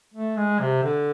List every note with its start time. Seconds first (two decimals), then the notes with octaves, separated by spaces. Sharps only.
0.13 A3
0.37 G#3
0.60 C3
0.83 D3